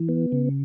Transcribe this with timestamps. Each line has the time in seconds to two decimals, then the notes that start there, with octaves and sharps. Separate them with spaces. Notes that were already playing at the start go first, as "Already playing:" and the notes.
Already playing: E3
0.09 B3
0.32 C#3